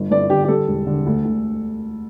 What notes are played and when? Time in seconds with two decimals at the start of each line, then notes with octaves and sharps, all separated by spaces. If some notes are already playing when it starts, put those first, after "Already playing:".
Already playing: G1
0.11 G1 D5
0.30 D3 G4
0.44 G4
0.48 G3 A4
0.68 E1
0.87 D3
1.06 D2
1.25 D2